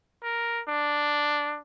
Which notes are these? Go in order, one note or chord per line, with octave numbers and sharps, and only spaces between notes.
A#4
D4